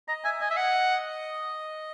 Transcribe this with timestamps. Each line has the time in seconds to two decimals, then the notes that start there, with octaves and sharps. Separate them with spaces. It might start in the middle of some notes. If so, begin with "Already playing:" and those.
0.08 D#5 A#5
0.24 E5 G#5
0.41 D#5 G#5
0.50 E5
0.57 F#5